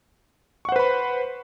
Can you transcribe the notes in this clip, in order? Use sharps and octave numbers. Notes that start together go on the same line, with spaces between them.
B4 C5 F#5 B5 C#6